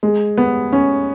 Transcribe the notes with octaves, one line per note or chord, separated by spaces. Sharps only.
G#3
B3
C#4